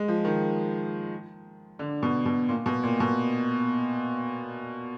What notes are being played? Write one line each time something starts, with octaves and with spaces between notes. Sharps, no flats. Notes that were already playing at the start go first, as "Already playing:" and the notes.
Already playing: G#3
F3
D#3
D3
B2
B2
A#2
B2
A#2
B2